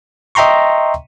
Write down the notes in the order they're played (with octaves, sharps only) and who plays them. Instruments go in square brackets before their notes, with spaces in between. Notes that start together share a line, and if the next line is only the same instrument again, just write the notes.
[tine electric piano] D#5 E5 G5 A#5 C6 C#6